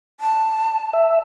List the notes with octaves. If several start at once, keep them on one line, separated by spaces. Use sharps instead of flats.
A5
E5